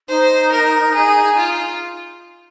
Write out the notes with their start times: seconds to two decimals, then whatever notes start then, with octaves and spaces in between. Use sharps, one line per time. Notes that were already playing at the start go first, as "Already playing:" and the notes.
0.08 D#4 C5
0.52 A#4
0.94 G#4
1.37 F4